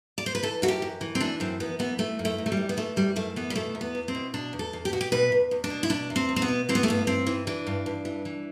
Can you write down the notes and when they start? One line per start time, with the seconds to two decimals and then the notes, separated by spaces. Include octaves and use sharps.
0.18 D5
0.26 C5
0.35 B4
0.43 E3 A4
0.62 F#2 F#4
0.68 G4
0.82 F#2
1.01 E3
1.15 C4
1.20 E3 D4
1.40 F#2 C4
1.60 F#2 B3
1.79 E3 B3
1.98 E3 A3
2.19 F#2
2.25 A3
2.38 F#2
2.46 A3
2.52 G3
2.57 E3
2.69 B3
2.77 E3 A3
2.96 F#2 G3
3.16 F#2 A3
3.36 E3 B3
3.50 G3
3.55 B2 A3
3.75 E2
3.81 B3
3.95 E2
4.08 C4
4.15 B2
4.34 B2 D4
4.53 E2
4.59 A4
4.73 E2
4.85 G4
4.92 B2 F#4
5.01 G4
5.12 B2 B4
5.32 E2
5.51 E2
5.64 D4
5.70 B2
5.83 E4
5.89 B2 D4
6.10 E2
6.16 C4
6.29 E2
6.36 C4
6.42 B3
6.48 B2
6.69 E3 C4
6.75 B3
6.83 A3
6.88 G2 B3
7.07 G2 C4
7.27 E3
7.47 E3 D4
7.67 G2
7.86 G2
8.05 E3
8.25 E3